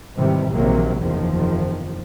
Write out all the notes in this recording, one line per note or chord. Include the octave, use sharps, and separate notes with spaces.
G#2 C3 D#3 E3 G3
A#1 C3 D#3 F#3 A#3
F#1 E2 C3 D#3 F3